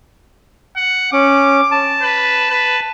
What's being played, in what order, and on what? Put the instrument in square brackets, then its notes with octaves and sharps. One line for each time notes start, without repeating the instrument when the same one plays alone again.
[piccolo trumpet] F#5
[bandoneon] C#4 [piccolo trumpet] D6
[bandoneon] A5
[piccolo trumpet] B4
B4